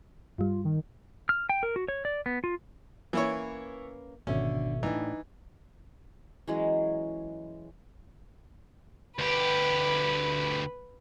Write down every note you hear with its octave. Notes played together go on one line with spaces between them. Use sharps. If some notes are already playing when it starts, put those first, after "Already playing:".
G2 G3 F4
D#3
F6
G5
A#4
F#4
C#5
D5
B3
F4
E3 A#3 C#4 E4 B4 C#5
G#1 B2 D3 C#4 E5
A2 E3 D4 D#4
E3 F#3 G#3 C#4
D2 G4 B4